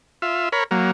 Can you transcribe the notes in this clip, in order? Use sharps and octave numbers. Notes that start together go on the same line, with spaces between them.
F4 E5
A#4 C#5 B5
F#3 A#3